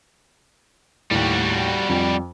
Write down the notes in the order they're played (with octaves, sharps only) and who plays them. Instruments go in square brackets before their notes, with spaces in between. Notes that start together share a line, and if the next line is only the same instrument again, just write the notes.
[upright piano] D#2 A2 [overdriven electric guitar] G3 F#4
[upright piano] F2